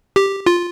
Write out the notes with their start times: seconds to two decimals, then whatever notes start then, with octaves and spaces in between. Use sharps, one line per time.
0.16 G4
0.46 F4